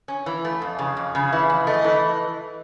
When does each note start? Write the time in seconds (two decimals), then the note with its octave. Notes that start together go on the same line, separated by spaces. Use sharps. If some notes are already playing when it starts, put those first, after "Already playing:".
0.08 C#4
0.26 E3
0.45 A3
0.62 F2
0.79 C#3
0.97 F2
1.15 C#3
1.32 E3 E5
1.50 F2
1.67 A3 D#5
1.84 E3